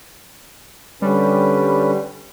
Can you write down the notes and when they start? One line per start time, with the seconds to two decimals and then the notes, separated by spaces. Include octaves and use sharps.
1.02 D3 G3 C#4 B4